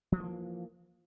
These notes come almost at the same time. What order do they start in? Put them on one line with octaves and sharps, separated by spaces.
F3 E3 A3 A#3